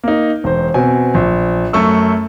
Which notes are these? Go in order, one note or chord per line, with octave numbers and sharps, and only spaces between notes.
A#3 D#4
E1 C5
B2 C4 G#5
A#1
F#2 A3 C#6 E6